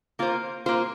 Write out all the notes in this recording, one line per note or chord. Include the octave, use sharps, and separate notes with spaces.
A#3 F4 C5
A#3 F4 C5